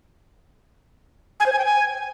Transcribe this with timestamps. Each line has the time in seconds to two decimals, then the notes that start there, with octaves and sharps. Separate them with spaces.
1.40 G#5
1.46 C5
1.52 G#5
1.59 G5
1.65 G#5